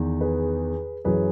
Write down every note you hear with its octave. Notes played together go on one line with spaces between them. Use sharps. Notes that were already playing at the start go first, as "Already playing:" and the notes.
Already playing: E2 D#3
G#4 B4
F#2 E3 G#4 B4